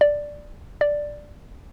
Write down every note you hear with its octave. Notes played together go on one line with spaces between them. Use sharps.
D5
D5